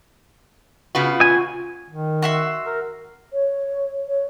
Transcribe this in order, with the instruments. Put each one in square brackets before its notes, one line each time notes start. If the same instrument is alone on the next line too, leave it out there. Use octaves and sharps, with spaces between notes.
[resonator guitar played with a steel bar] C#3 B3 F#4 [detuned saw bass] F4
[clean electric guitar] G#5
[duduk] D#3
[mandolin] F#4 E5 C6
[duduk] A#4
[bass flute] C#5
C#5